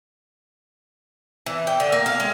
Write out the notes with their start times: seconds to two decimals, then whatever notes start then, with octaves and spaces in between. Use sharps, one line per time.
1.46 E3
1.67 G5
1.80 D3
1.92 A#3
2.06 F5
2.20 G#3